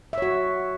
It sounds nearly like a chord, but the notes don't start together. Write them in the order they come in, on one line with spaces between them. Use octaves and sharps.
E5 C#5 F#4